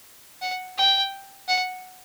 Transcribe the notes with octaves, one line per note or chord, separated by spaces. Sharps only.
F#5
G5
F#5